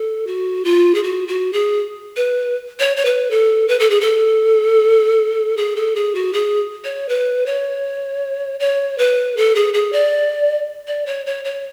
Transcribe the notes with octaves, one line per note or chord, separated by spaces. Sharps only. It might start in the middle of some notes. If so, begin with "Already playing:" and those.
Already playing: A4
F#4
F4
G#4
F#4
F#4
G#4
B4
C#5
C#5
B4
A4
B4
A4
G#4
A4
G#4
A4
G#4
F#4
G#4
C#5
B4
C#5
C#5
B4
A4
G#4
G#4
D5
D5
C#5
C#5
C#5